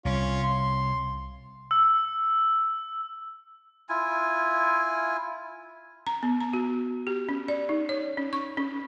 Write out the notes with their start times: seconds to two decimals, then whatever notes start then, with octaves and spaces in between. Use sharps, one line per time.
0.05 C2 C#4 F4
0.43 C6
1.71 E6
3.89 E4 F4 G#5
6.07 A#5
6.23 B3
6.41 A#5
6.53 F#4
7.07 G4
7.29 C#4
7.48 D5
7.69 D#4
7.89 C#5
8.17 C#4
8.33 C#6
8.57 C#4